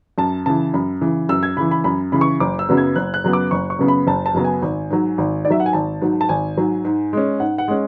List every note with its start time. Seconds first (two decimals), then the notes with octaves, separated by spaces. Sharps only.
0.18 F#2 A5
0.46 C#3 E3 A5
0.74 F#2 B5
1.01 C#3 E3
1.29 F#2 E6
1.43 G#6
1.57 C#3 E3 B5
1.71 B5
1.84 F#2 B5
2.12 C#3 E3 B5
2.21 C#6
2.40 F#1 D6
2.59 E6
2.69 F#2 C#3 F#3 B3
2.77 G#6
2.96 F#1 F#6
3.14 F#6
3.24 F#2 C#3 F#3 B3
3.33 D6
3.51 F#1 C#6
3.70 C#6
3.79 F#2 C#3 F#3 B3
3.88 B5
4.07 F#1 A5
4.26 A5
4.34 F#2 C#3 F#3 B3
4.44 G#5
4.62 G#1
4.90 G#2 F#3
5.18 G#1
5.45 G#2 D5
5.50 F#3 E5
5.60 F#5
5.66 G#5
5.73 G#1 A5
6.02 G#2 F#3
6.21 A5
6.29 G#1 G#5
6.58 G#2 F#3
6.85 G#2
7.13 G#3 C#4
7.40 G#2 F#5
7.58 F#5
7.68 G#3 C#4